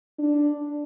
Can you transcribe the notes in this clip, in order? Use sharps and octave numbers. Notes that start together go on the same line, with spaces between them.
D4